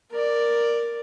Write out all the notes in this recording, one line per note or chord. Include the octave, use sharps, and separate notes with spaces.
A#4 D5